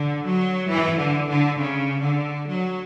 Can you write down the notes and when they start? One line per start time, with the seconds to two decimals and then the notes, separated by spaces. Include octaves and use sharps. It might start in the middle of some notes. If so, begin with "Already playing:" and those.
Already playing: D3
0.25 F#3
0.70 E3
0.99 D3
1.28 D3
1.58 C#3
2.02 D3
2.47 F#3